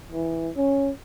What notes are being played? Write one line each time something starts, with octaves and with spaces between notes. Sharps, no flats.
E3
C#4